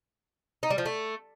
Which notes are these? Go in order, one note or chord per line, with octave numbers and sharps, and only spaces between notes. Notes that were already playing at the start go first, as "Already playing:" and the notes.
D#4
G3
F3
A3